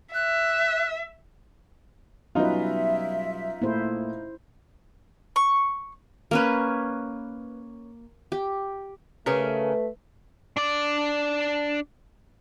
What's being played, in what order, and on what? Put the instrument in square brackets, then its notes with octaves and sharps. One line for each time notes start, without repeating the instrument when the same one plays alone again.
[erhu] E5 [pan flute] F#6
[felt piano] B2 F#3 G3 [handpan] C#4 B4 [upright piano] D#4 F4 [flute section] E5
[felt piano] A#2 A3 [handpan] E4 C5
[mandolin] C#6
[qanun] A#3 C#4 B4
G4
[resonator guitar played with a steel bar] C#3 G#4 A#4 [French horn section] A3 [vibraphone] B4
[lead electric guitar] D4 D5